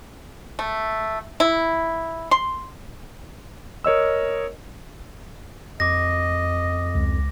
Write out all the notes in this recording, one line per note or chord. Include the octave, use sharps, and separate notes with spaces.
A3
E4
C6
A#4 C#5 D#5 E6
F2 D#5 D6 A#6
C#2